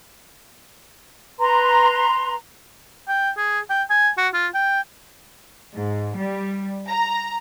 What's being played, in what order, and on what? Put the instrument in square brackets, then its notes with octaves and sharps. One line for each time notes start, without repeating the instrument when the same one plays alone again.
[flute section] B4 A#5 C6
[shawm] G5
G#4
G5
G#5
F#4
F4
G5
[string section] G#2
G3
A#5